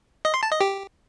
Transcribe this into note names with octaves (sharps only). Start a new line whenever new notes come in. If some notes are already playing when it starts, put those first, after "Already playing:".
D#5
C6
A5
D#5
G4